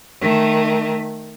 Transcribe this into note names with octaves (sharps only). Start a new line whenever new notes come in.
D#3 A3